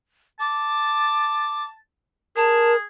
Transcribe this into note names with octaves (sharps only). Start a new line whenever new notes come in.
A5 D6
G#4 A#4 A5